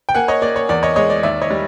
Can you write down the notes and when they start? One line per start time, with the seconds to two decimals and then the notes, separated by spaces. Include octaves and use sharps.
0.09 G5
0.15 A#3 F#5 G#5
0.28 C#5 D#5
0.42 A#3 D5
0.56 C#5
0.69 E2 D5
0.83 C#5 D#5
0.96 G#3 C#5 D#5
1.10 D5
1.23 D#2 D5 E5
1.42 C#5 D#5
1.50 G3